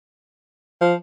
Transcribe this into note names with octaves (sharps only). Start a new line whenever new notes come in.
F3